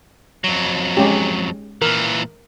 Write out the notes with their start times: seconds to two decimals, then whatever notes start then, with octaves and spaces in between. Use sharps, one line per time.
0.44 F2 F#3
0.97 G#3 C#4 G4
1.82 A#2 E3 A#4